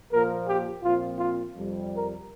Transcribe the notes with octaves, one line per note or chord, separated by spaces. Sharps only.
A#2 F3 A#3 A#4
G4
A#2 F3 C4 F4
F4
F2 C3 G3
A#4